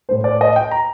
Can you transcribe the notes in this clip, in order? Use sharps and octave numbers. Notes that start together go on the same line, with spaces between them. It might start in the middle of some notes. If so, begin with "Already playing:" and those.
A2 A3 C5
D5
D#5
G5
A#5